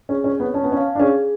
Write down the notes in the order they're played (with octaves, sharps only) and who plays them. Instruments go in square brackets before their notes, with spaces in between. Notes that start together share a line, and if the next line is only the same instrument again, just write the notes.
[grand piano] C#4 [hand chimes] G#4
[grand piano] C#4
[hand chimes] C#5
[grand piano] B3
[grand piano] C#4 [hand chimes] A5
[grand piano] B3
C#4
[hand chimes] F5
[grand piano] D4
[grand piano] C#4 [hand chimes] G#4